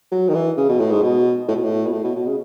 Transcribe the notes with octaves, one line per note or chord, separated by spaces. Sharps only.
F#3
D#3
E3
C#3
B2
A2
G#2
B2
A2
B2
A2
B2
A2
B2
B2
C#3